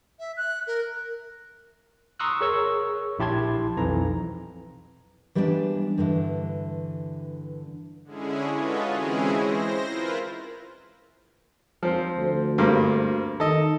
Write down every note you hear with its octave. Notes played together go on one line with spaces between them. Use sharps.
E5
F#6
A#4
A#5 C6 C#6 D#6 E6 F#6
G#4 A#4 C#5 C#6 E6
A#1 E4 G4 A5 C6 G#6
B1 F2 E3 A#5
E3 G3 G#3 B3 C4 D4
G2 D3 E3
D3 G#3 C#4 E4 G#4
F4 F#4 A4 B4 C#5 D#5
E3 G#3 C4 C#4 E4 G#4
C5 A#6
E4 F4 A#4 B4
F3 C4
D2
G2 A#3 C4
D#3 A4 D#5